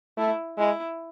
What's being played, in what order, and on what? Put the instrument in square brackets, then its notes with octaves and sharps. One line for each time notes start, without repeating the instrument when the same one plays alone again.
[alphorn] A3 [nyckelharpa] E4
[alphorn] G#3 [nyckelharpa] E4